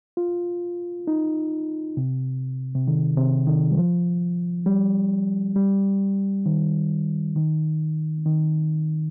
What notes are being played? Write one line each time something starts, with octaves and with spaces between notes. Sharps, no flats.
F4
D#4
C3
C3
D#3
C3
D#3
G3
F3
G3
G3
D#3
D#3
D#3